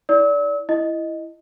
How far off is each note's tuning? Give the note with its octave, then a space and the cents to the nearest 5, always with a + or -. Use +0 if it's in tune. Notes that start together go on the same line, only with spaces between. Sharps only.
E4 -25 D5 -25 E6 -35
E4 +10 D#5 +0